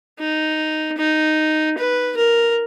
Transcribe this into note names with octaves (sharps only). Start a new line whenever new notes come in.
D#4
D#4
B4
A#4